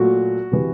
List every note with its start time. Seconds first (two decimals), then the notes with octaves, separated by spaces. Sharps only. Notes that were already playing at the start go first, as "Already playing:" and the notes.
Already playing: A#2 F#3 A3 F#4
0.52 C3 E3